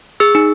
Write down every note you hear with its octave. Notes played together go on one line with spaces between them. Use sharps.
G#4 E6
D#4